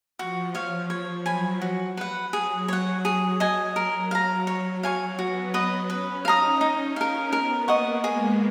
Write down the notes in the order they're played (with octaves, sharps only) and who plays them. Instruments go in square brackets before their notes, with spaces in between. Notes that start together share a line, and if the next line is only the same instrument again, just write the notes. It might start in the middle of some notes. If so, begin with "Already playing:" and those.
[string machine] F3 [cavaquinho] F#4
[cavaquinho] C#5 F5
[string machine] F3 [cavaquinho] C#5
[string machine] F#3 [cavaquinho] G#5 B5
[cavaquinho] F#4
B4 F#5
[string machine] F#3 [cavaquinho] G#4
[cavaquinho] C#5 F#5
[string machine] F#3 [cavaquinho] G#4
[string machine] F#3 [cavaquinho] D#5 G#5
[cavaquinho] A#4
F5 A#5
[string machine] F#3 [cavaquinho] C#5
[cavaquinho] F5 G#5 C#6
[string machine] B3 [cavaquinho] F#4
[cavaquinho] B4 D#5
[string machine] C#4 [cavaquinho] B4
[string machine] D#4 [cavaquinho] F5 A#5 D#6
[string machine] C#4 [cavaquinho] D#4
[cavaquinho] A#4 F5
[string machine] B3 [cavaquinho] A#4
[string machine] A#3 [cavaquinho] D#5 F#5 C#6
[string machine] G#3 [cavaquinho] G#4